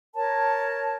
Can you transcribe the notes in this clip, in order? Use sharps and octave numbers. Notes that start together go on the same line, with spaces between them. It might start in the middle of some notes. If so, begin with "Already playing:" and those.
A#4 C#5 A5